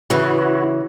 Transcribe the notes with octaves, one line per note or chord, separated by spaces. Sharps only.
C#3 E3 E4 F#4